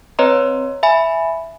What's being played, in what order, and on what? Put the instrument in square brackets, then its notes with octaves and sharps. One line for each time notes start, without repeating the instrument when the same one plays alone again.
[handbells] C4 B4 C#5 D#5 A#5 C6
E5 G#5 B5